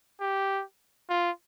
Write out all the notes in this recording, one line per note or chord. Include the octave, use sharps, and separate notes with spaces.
G4
F4